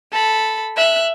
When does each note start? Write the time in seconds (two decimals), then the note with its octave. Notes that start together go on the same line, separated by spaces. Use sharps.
0.12 A4 B5
0.77 E5 F#6